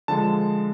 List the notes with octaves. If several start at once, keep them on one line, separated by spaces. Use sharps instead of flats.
D3 F3 G#3 A5